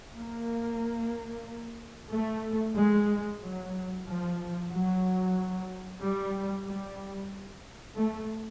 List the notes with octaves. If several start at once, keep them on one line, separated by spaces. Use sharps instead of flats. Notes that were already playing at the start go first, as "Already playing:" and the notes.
A#3
A3
G#3
F#3
F3
F#3
G3
G3
A3